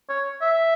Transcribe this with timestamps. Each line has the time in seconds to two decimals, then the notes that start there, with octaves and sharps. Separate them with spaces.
0.09 C#5
0.42 E5